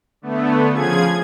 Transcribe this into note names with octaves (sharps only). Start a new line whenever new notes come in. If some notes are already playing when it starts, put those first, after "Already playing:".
D3 A3 B3
C#3 F3 G#4 G#6